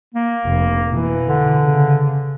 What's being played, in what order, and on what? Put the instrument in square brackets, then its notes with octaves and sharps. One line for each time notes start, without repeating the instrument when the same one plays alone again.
[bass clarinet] A#3
[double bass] F1
B2 E3
[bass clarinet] D3
[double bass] C#3